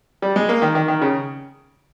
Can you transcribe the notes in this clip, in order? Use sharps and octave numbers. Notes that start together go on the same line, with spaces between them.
G3
G#3
A#3
D#3
D#3
D#3
C#3